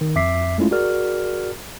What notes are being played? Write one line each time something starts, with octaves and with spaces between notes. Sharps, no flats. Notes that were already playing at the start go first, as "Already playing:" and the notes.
D#3
F2 E5 D6 B6 C7
G#3 A3 C#4 E4 F4
F#4 G#4 A#4 D5 F6